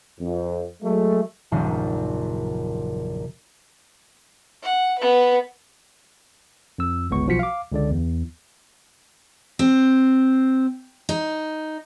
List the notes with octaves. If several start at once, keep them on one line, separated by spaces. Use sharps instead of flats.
F2
F#3 G#3 A3
D#1 A#1 F#2 C#3 F5
F#5
B3 B4
F2 E6
G1 C#2 B3 C#6
B1 F3 F4 F#4 B6 C#7
F5 D6
C#2 D3 D5
E2
C4
D#4